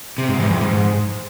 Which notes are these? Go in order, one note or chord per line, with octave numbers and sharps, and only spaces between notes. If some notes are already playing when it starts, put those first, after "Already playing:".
C3
G#2
E2
F2
G#2